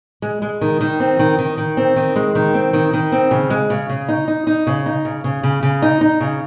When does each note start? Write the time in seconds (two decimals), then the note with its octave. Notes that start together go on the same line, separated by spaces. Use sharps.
0.22 G#3
0.42 G#3
0.61 D#3
0.81 D#3
1.00 C4
1.19 D#3
1.39 D#3
1.58 D#3
1.77 C4
1.96 D#3
2.16 G#3
2.35 D#3
2.54 C4
2.73 D#3
2.93 D#3
3.12 C4
3.31 C#3
3.50 G#3
3.70 C#3
3.89 C#3
4.08 D#4
4.28 D#4
4.47 D#4
4.67 C#3
4.86 D#4
5.05 C#3
5.24 C#3
5.43 C#3
5.63 C#3
5.82 D#4
6.01 D#4
6.20 C#3